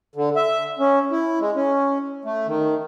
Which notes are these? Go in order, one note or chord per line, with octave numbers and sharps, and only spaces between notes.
D3
E5
C#4
E4
G#3
C#4
A3
D#3